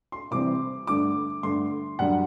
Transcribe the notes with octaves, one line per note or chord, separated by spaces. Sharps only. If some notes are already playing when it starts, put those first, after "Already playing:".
C6
C3 E3 G3 C4 D6
G2 D3 A3 D6
G2 D3 A3 C6
F#2 D3 G3 D4 F#5